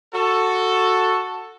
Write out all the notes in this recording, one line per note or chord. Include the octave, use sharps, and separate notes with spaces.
F#4 A4